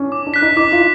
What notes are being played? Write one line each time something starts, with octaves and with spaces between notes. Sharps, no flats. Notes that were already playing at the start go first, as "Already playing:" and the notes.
Already playing: C#4 D4
D6
D4
F#6 B6
D#4
D#4 D6
F4